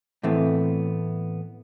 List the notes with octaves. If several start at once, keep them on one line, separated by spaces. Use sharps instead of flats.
A2 E3 A3 B3 C4